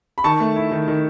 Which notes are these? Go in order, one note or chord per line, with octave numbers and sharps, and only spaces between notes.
B5
D#3 A5 C#6
A3
E4
D#3
D#3